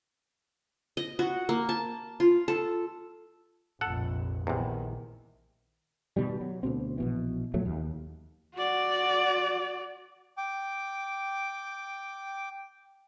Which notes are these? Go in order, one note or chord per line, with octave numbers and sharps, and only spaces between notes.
D#5
F#4
A#3
A5
F4
A4
F1 A#1 A4 F#5
A#1 E2 C3 D#3
B2 D#3 G3
F#3
D2 B2 C4
A#1 B2 E3
E2 A#2 F#3 A3
D#2
F#4 D5
G5 D6